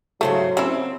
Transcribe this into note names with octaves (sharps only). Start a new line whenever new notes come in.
G#2 C#3 F#3 A3 C5
C4 C#4 E4